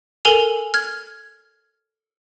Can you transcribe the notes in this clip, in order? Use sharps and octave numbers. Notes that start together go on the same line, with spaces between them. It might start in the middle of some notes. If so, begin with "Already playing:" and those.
A4 A#4 G#5 F7
F6 G#6